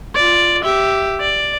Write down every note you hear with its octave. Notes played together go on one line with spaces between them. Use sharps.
F4 D5
G4 E5
D5